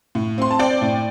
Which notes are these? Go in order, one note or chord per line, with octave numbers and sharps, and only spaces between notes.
A2
C4 C6
A5
C4 D5 G5
A2